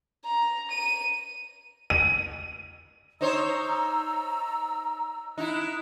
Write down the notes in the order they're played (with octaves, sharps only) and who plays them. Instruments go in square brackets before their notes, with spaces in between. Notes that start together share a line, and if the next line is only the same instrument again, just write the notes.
[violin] A#5
D#7
[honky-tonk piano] D#7
[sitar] D#4 C5 C#5 [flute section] A#5 E6
[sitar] D#4 E4 [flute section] F#6